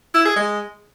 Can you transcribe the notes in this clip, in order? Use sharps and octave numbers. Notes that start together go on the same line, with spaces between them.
E4
G#4
G#3